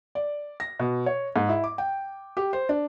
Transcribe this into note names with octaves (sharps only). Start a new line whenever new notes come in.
D5
A#6
B2
C#5
G#2
E4
D6
G5
G4
C5
D4